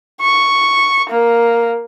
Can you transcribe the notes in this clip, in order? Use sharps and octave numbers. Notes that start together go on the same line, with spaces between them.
C#6
A#3